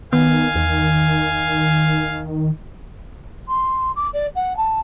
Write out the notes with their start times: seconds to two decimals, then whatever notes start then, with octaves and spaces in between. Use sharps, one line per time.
0.13 D#3 B3 F5 G#5
0.56 E2
3.48 C6
3.96 D6
4.13 D5
4.35 F#5
4.57 A5